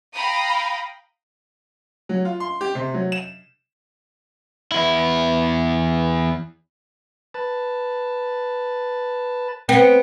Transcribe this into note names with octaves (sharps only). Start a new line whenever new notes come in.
F5 G5 A#5 B5 D#6
F#3
F4
C6
G4
C3
F#3
E7
E2 E4
B4 A5
B3 C4